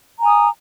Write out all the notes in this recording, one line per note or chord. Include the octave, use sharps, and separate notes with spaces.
G#5 A#5 D#6